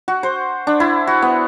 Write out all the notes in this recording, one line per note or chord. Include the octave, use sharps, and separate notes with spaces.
F#4
C5
D4
E4
F#4
B3